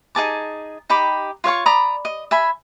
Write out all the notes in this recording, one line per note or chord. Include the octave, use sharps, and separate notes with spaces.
D#4 G#4 A5 D6
D#4 G4 B5 D6
F4 C#5 F5 C#6
D5 A#5 B5 D#6
D#5
E5 G#5 B5